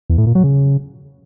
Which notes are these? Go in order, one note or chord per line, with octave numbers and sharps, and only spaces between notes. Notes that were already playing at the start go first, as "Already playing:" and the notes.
E2
A2
A#2
F#3
C#3